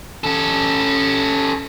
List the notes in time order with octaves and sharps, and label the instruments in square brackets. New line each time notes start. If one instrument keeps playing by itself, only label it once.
[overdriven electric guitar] C#4 A4